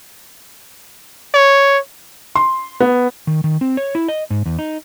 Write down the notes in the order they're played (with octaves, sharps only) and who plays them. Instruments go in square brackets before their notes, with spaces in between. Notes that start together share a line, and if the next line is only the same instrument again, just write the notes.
[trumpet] C#5
[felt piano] C6
B3
[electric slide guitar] D#3
D#3
C4
C#5
E4
D#5
G#2
E2
D#4